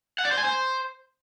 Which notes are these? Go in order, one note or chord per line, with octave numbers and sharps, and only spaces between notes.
F#5
D5
C5
G#5
C5